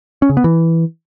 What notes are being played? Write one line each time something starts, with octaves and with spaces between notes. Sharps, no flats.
C#4
C#3
B3
E3